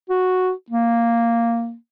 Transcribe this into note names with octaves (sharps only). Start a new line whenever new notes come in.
F#4
A#3